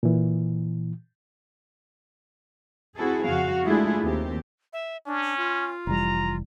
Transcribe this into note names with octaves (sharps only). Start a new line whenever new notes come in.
A#2 E3
C4 E4 F#4 G#4 A4
F2 C#3 F#4 F5
G#3 A3 D4 E4 F4 G#4
D#2 C4 G4
E5
C#4 D4
F4
F1 E3 G3 A#5